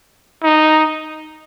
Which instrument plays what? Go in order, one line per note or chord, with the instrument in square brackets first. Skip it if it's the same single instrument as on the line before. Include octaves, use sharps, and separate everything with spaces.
[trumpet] D#4